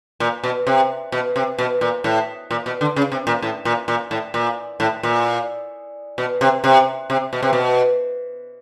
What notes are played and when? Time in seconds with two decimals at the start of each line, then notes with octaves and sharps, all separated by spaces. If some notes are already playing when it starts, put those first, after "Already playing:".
0.20 A#2
0.43 B2
0.67 C3
1.12 B2
1.36 C3
1.58 B2
1.81 A#2
2.04 A2
2.51 A#2
2.66 B2
2.81 D3
2.96 C#3
3.12 C3
3.27 A#2
3.42 A2
3.65 A#2
3.88 A#2
4.11 A2
4.34 A#2
4.80 A2
5.03 A#2
6.18 B2
6.41 C3
6.64 C3
7.10 C3
7.33 B2
7.43 C3
7.53 B2